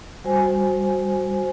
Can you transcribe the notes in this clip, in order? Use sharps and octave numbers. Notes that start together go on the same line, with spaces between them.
G3 F#4 C5 G#5